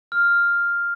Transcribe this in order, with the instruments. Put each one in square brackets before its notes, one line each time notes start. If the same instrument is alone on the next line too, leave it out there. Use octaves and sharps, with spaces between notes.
[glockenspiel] F6